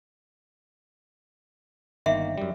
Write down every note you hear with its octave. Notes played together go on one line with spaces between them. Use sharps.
G1 D#3 A#3 E5
F#2 G3